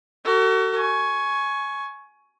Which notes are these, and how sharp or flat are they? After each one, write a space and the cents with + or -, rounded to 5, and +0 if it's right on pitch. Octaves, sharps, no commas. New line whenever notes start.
F#4 +30 A4 +45
G#5 +20 C#6 +0